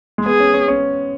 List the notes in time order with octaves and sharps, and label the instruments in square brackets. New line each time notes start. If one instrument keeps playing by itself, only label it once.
[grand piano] G#3
[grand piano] B3 [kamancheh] G#4
[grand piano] C#4
C#4
C#4